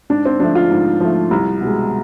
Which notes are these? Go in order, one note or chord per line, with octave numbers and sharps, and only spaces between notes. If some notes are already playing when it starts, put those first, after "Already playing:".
G#2 D4
C4
F3 A3 D4
F4
G#2
F3 A3
C2
B2
G#3